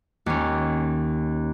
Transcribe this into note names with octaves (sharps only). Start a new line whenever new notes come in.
D#2 C#4